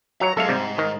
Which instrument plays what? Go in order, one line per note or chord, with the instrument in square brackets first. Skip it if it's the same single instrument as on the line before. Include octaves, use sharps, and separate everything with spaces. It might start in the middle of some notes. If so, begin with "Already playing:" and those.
[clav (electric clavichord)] F#3 C#5 [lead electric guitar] A#5
[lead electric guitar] F#2 G#3 [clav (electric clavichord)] A4 E5 F5
[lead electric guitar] G#2 [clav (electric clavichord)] C3 G3
[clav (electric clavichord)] D#3